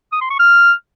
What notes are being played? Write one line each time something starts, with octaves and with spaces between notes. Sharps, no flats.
D#6
C6
C#6
F6